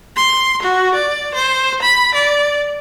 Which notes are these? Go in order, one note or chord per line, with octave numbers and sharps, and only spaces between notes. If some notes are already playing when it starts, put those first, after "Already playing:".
C6
F#4
D5
C5
B5
D5